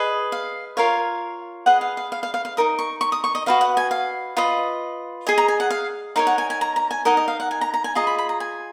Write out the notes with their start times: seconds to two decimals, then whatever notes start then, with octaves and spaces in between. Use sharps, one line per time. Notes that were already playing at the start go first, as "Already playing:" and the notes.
Already playing: G#4 B4 D#5
0.32 F5
0.77 F4 A#4 C#5 F5
1.66 G#4 B4 D#5 F#5
1.81 F5
1.97 F5
2.12 F5
2.23 F5
2.34 F5
2.45 F5
2.57 D#4 A#4 D#6
2.79 C#6
3.01 C#6
3.12 D#6
3.24 C#6
3.35 D#5
3.46 F#4 B4 D#5 F5
3.61 F#5
3.77 G#5
3.91 F5
4.37 F4 B4 D#5
5.27 G#4 D#5 G#5
5.38 A#5
5.48 G#5
5.60 F#5
5.70 F5
6.16 D#4 A#4 C#5 F5
6.27 F#5
6.38 G#5
6.50 G#5
6.61 A#5
6.76 A#5
6.91 G#5
7.05 D#4 A#4 D#5 F#5
7.17 D#5
7.28 F5
7.40 F#5
7.51 G#5
7.61 A#5
7.74 A#5
7.84 G#5
7.95 F4 G#4 D#5 A#5
8.07 B5
8.18 B5
8.29 A#5
8.40 G#5